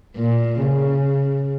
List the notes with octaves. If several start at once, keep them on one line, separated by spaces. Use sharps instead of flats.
A#2
C#3